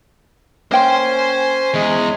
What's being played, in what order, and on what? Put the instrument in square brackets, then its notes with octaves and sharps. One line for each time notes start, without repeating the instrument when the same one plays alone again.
[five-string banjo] A#3 G5 [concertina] C#4 G#5 [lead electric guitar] C5 C6
[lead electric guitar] E2 [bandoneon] G#3